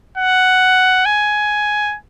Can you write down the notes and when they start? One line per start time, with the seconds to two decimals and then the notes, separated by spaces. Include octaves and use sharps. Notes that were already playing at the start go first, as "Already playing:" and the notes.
0.18 F#5
1.06 G#5